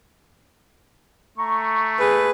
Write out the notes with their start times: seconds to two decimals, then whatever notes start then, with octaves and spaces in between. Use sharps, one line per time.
1.38 A3 A#5 C#6
1.99 G#4 B4